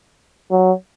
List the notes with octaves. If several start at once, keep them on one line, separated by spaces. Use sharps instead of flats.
F#3